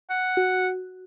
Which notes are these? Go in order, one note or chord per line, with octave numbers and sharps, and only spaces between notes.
F#5
F#4